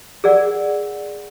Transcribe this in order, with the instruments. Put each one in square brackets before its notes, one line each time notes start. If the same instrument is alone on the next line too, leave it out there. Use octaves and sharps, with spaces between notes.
[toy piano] G#4 A#4 D5 F#5